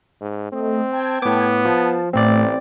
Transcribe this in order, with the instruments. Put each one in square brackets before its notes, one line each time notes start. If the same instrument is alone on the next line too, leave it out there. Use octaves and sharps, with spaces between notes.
[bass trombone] G#2
[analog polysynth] A3 D#5 [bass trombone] C4
[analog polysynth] G5 A5 G#6
[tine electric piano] A2 D6 [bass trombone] B3
[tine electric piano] F3 [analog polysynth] A5
[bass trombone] A1 [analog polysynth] A2 A3 [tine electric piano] C4 D5